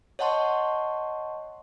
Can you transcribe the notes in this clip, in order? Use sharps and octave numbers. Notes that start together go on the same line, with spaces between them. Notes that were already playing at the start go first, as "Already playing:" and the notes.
C#5 D#5 F#5 A5 C6 C#6